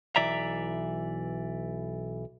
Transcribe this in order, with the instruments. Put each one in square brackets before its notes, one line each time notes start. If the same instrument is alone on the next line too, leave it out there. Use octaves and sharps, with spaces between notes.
[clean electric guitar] B1 E3 D5 E5 A#5